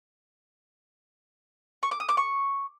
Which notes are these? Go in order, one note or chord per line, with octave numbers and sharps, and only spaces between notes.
C#6
D6
D#6
D6
C#6